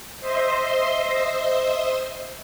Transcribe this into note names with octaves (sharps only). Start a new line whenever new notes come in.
C5 D#5 E5 C6